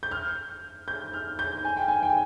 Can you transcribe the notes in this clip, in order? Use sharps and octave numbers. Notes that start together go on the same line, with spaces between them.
G6
F6
G6
F6
G6
G#5
G5
G#5
G5
G#5